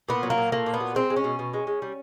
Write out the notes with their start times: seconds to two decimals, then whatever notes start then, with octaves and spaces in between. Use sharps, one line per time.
0.09 A#2 B3
0.23 F#3
0.30 A#3
0.38 A#2
0.52 A3 A#3
0.66 A#2
0.74 B3
0.80 F#3
0.95 G#3 C4
1.10 G#3
1.16 C#4
1.24 B2
1.39 B2
1.54 G#3
1.67 G#3
1.82 G3